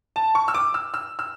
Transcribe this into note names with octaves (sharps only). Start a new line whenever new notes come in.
A5
C#6
E6
D6
E6
E6
E6